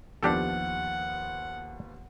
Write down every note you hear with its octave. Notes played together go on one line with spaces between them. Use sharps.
D#2 F3 B3 D4 G4 A4 F#5